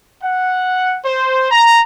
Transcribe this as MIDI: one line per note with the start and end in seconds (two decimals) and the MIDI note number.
0.23 0.98 78
1.05 1.48 72
1.52 1.81 82